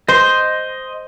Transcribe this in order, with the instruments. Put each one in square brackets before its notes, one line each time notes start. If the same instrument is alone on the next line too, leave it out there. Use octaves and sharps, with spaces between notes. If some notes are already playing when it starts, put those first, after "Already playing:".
[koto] C5 [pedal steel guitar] D#5 C6